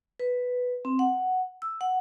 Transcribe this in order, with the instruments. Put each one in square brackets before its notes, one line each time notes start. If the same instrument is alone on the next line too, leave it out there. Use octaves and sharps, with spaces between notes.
[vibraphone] B4
C4
F#5
E6
F#5